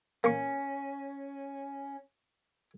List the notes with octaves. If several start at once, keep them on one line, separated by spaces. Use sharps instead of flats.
A#3 C#4 C#6